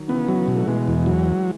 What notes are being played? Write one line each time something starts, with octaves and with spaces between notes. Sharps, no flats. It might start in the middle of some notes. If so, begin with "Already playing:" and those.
Already playing: D#3 F#3
C#3 E3 B3
F#3
B2
A3
B2 E3 G#3
E2
F#3